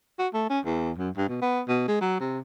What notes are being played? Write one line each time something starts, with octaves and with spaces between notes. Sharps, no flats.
F#4
A3
C#4
E2
F#2
G2
B2
B3
B2
G#3
F#3
C3